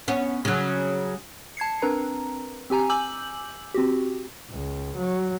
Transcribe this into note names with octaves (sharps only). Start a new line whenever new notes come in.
B3 C#4
C#3 F#3
A5 G#6 C7 C#7
C4 D4 A#4 B4 A#5
C4 G4 G#5 A#5
G#5 D6 E6 G6 F#7
C4 F#4 G4
C#2
F#3